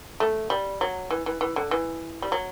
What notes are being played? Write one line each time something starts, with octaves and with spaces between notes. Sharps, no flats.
A3
G3
F#3
E3
E3
E3
D3
E3
G3
F#3